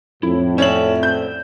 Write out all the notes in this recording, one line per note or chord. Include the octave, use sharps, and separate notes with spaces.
F2 A2 E4
C#4 C5 D5 E5 F#7
G6